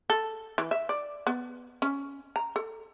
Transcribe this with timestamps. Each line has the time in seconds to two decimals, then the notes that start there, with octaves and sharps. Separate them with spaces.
0.10 A4
0.58 E3
0.71 E5
0.89 D5
1.27 B3
1.82 C#4
2.36 A#5
2.56 A4